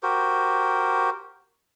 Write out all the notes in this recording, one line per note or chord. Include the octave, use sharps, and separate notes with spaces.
F#4 G4 A#4 C5